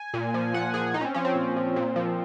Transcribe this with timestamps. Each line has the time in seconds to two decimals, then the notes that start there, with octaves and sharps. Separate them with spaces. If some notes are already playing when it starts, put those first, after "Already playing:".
Already playing: G#5
0.14 A#2
0.34 F3
0.54 A#2 F#5
0.74 F3 G#4
0.94 A#2 D#4
1.01 C#4
1.04 C4
1.14 F3 C#4
1.25 C4
1.35 A#2
1.56 F3
1.76 A#2
1.96 F3